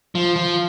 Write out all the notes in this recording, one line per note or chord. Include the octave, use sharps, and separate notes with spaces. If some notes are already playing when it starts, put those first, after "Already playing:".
F3
F3